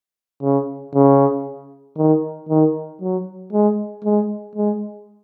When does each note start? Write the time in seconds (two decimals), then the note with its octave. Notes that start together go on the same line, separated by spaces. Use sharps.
0.43 C#3
0.95 C#3
1.98 D#3
2.49 D#3
3.02 F#3
3.53 G#3
4.05 G#3
4.55 G#3